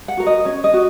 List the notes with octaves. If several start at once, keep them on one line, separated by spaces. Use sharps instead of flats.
F#5
F#4 A#4
D#5
C#4 C#5
D#5
F#4